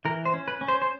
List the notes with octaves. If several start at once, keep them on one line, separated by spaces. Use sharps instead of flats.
E3 A#4
C5
C#4
B4
C#4
C5
C5